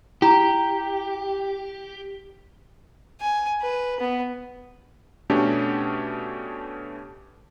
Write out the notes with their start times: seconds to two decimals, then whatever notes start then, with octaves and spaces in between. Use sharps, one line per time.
0.22 E4 G4 A#5
3.20 G#5
3.61 B4
4.00 B3
5.30 B2 A3 C#4 D4 G4